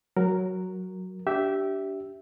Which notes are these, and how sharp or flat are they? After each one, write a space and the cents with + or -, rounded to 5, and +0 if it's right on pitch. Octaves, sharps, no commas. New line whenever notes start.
F#3 +0 A#4 -5
D4 -25 G4 -20 E5 +0